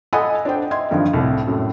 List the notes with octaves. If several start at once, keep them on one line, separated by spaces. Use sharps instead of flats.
A4 D#5 F#5 G#5 B5 D#6
D4 C5 G5
D#5 E5 C6 G#6
G2 D3 D#3 F3
C2 A2
F#2 A2